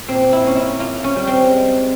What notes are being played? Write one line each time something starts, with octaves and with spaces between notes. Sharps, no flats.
A#2 C4
E4
A#3 C#4
E4
A#3 F4
C#4
G3
C4
G#3